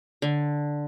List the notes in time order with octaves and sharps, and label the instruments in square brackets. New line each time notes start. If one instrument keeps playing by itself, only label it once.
[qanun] D3